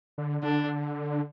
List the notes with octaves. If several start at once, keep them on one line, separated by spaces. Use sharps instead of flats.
D3
D3 D4